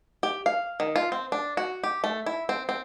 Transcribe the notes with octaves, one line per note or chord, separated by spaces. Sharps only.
G4
F5
D#3
F4
C4
D4
F#4
G4
A3
E4
C4
C4